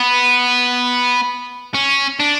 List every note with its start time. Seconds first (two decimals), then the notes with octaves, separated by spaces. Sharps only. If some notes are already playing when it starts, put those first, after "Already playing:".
Already playing: B3
1.74 C#4
2.19 D4